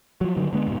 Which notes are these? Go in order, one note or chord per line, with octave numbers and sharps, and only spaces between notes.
F3 F#3
G2 D3 D#3 F#3
D3 G#3 B3
F1 G#2 B2